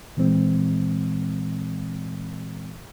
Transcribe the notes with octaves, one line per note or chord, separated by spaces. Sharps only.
A#2 E3 G#3 C4